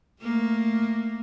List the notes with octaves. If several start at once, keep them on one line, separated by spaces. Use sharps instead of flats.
A3 A#3